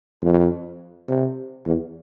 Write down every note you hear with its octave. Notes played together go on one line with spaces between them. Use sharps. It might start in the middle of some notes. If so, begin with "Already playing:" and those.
F2
C3
E2